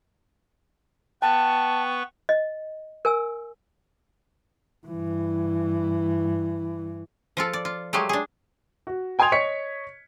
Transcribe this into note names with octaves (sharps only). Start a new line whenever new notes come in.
B3 B4 G5 A5 C#6
D#5
A#4 G#5 E6
G2 E3
F3 F4 A4
D5
F4
F#3 G#3 A3 G4 G#4
D4 G#4
F#4
G5 G#5 C6 D#6 G#6 F7
C#5 D#5 C#6 B6 C#7